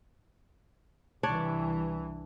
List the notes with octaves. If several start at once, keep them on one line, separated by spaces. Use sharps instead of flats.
C2 E3 D4 C#5 D5